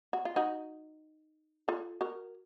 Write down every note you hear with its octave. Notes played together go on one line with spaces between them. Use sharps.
F#4
F4
D#4 F#4
F4 A4
F#4 A#4